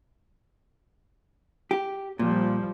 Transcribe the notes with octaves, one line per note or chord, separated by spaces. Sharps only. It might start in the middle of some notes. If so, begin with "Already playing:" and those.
G4
A#2 F3 G3